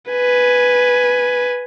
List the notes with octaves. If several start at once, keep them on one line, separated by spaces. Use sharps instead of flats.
B4 G#5